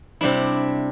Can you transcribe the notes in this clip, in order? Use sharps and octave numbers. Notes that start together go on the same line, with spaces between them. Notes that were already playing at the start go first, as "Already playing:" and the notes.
C3 G3 D4 E4